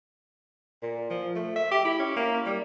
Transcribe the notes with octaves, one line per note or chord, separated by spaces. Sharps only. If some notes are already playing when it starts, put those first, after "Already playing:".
A#2
F3
A3
E5
G4
E4
C#4
A#3
G3